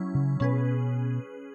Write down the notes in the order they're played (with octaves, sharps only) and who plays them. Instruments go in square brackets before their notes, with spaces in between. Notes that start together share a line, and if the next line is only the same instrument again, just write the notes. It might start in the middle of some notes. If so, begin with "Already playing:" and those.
Already playing: [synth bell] F#3 C#4 E4
[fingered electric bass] C#3
[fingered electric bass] B2 [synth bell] C#4 G#4 B4